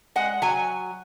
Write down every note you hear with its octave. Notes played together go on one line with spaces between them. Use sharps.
G#3 F#5
F#3 G#5